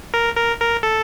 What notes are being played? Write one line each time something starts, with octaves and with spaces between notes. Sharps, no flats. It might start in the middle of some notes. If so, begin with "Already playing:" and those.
A#4
A#4
A#4
A4